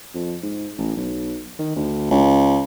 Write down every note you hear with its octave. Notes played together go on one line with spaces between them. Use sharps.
F2
G#2
A1
B1
D#3
D2
C#2